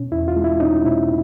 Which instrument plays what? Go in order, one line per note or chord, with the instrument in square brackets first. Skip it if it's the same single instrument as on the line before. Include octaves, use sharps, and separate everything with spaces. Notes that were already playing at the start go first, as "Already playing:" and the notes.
Already playing: [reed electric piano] B2 C#4
E2 E4
F4
G#3
E4
C#4 D#4
B2 E4